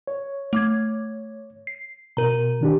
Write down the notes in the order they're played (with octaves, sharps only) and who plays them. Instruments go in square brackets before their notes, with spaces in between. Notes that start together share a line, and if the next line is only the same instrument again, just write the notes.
[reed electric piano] C#5
[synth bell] A3 D6 G#6
C7
[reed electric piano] B2 [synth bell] A#4 A#5
[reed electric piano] D#3 D4 G4